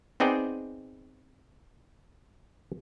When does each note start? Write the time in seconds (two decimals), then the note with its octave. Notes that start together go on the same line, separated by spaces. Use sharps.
0.20 B3 C4 D#4 G#4 D5 G5